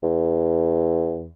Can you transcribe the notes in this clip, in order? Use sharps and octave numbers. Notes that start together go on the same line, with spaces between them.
E2